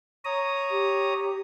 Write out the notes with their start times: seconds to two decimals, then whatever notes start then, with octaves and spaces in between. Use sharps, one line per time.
0.25 C#5 A#5 D#6
0.71 G4